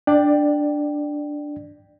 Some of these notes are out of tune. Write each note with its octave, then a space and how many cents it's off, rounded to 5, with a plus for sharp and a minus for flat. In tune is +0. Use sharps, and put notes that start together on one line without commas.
D4 +0 D5 +15 G5 +0